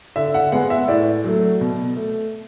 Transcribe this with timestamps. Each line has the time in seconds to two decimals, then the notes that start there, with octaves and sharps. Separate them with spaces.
0.16 D3 E5
0.34 F#5
0.52 G#3 B3 F#5
0.70 E5
0.88 A2 D5
1.24 F#3 A3
1.61 B2
1.96 A3